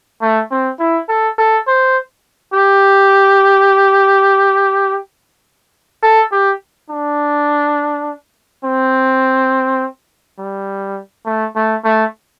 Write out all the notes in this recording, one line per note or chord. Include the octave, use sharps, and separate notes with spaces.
A3
C4
E4
A4
A4
C5
G4
A4
G4
D4
C4
G3
A3
A3
A3